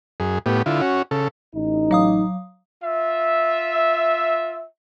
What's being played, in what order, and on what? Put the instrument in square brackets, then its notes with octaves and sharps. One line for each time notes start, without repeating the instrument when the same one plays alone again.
[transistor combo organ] F#2 G#4
A2 B3 G4
D3 E4 F4
C#4 F#4
C#3 A4
[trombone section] A1 D#4
[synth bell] F#3 F5 D#6
[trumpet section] F4 E5